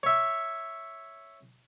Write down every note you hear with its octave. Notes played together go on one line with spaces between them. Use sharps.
C#5 E5